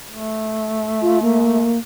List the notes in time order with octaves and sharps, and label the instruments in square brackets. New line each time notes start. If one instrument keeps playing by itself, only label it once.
[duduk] A3
[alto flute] F4
A#3